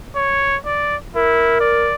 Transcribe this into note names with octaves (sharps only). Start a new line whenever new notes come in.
C#5
D5
E4 A#4
D5